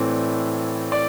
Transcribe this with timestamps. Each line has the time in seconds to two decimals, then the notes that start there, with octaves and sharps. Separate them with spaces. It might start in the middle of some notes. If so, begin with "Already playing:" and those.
Already playing: A2 E3 A3 C4 D5
0.92 D5